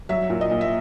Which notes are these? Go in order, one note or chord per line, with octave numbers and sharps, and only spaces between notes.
F#3 E5
A#2
D#5
A#2
E5